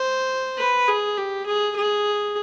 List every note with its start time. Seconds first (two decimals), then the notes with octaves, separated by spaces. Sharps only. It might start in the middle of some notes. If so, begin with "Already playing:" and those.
Already playing: C5
0.58 B4
0.88 G#4
1.17 G4
1.46 G#4
1.76 G#4